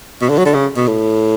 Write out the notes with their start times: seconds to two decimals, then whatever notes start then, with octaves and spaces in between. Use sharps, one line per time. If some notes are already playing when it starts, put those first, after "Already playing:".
0.21 B2
0.29 D3
0.38 F#3
0.45 D3
0.54 C#3
0.76 B2
0.88 A2